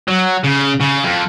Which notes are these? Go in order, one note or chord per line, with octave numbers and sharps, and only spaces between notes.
F#3
C#3
C#3
F2